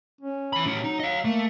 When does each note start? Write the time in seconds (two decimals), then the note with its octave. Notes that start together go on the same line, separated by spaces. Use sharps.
0.21 C#4
0.53 E3 B5
0.65 A2 F#3 C#4
0.84 D#4
1.00 D#5 F5
1.25 A3 A#3